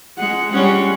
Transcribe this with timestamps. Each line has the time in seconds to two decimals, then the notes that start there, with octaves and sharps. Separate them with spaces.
0.19 G#3 F#5
0.53 G3 G#3 C#4 F#5